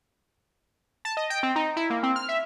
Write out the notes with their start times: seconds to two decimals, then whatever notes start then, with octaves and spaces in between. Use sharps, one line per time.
1.05 A5
1.17 D#5
1.30 G5
1.43 C4
1.56 D#4
1.76 E4
1.90 A#3
2.03 C4
2.16 F6
2.29 E5